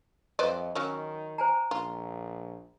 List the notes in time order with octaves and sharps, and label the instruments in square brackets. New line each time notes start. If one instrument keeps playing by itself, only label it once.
[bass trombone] F2 [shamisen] B4 C5 D5 [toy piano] D#5 D#6
[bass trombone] D#3 [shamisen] F#3 C#4
[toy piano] C5 G#5 A#5
[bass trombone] A#1 [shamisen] F4